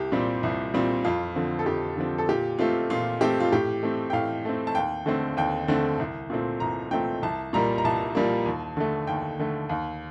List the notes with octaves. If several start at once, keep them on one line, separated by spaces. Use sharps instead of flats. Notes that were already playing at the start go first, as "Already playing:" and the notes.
Already playing: C2 G4
A#2 G3 C4
C2
A#2 G3 C4
F2 F4
D3 F3 C4
A4
F2 G4
D3 F3 C4
A4
A#2 G4
A3 C4 F4
A#2 F4
A3 C4 G4
F4
A2 G4
A3 C4
G5
A2 F5
A3 C4
A5
D#2 G5
D3 A3 C4
D#2 G5
D3 A3 C4
C2
A#2 A3 C4
C2 A#5
A#2 A3 C4 G5
C2 A5
A#2 G3 A#3 A#5
A#5
C2 A5
A#2 G3 A#3
D#2
D3 A3
D#2 G5
D3 A3
D#2